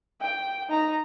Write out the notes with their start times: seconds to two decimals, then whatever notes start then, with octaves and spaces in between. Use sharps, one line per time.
0.21 G5
0.70 D#4 A#5